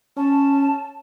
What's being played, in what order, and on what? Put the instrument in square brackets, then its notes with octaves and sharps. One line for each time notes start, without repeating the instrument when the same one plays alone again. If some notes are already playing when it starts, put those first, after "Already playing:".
[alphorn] C#4 [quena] A5